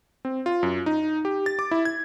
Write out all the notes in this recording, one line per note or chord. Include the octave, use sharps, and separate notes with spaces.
C4
F4
F#2
D#4
G4
A6
D6
E4
G#6